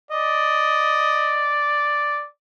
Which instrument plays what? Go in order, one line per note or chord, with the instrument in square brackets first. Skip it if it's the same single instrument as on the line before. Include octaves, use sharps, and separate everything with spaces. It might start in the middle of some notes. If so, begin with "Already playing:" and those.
[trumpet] D5 [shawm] D#5